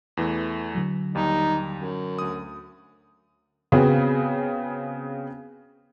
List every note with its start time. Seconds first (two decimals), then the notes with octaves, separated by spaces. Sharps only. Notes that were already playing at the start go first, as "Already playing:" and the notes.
0.17 E2 E3 A3
0.75 D3 F#3
1.15 D#2 G3 D#4
1.76 F#2
2.19 D2 D#6
3.72 C#3 B3 C4 F#4 G#4